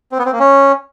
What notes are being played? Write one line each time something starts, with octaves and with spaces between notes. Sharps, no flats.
C4
B3
C4
A#3
C#4